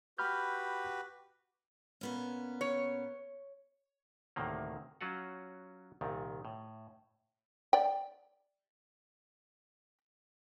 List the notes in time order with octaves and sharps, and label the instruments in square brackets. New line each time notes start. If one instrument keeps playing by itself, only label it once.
[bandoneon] F#4 G4 B4 [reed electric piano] B5 F6 G6
[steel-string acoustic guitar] A#2 B3 C#4
[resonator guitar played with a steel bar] C#5
[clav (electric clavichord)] D2 A2 C3 D#3 A#3
F#3 C#4 F4 F#4 F#5
C2 A#2 D#3
A2
[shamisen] D5 G5